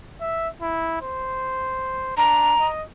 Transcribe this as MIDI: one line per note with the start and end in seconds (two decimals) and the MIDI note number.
0.21 0.48 76
0.62 0.98 64
1.02 2.15 72
2.17 2.54 62
2.17 2.65 82
2.59 2.83 75